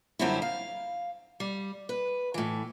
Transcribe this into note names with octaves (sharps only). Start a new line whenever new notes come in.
F#2 D3 G3 C4 C#4 E4
F5
G3
B4
A2 E3